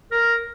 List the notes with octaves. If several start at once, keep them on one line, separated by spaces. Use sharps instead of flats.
A#4